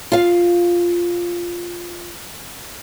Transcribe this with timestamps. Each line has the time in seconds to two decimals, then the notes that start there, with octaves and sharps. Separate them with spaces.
0.12 F4 F5